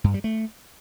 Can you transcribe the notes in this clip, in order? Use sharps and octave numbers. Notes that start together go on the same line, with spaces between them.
G2
G3
A3